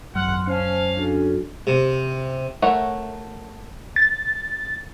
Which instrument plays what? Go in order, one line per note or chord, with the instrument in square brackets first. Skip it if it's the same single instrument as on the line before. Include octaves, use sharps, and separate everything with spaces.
[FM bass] G#1 [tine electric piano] F#2 F#3 F6 [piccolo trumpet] F#5 [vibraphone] C6
[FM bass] C#4 [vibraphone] C5 A5 [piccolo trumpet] F5
[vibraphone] D4 F#4 A4
[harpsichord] C3
[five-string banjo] A3 A#4 C#5 E5 F#5
[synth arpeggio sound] A6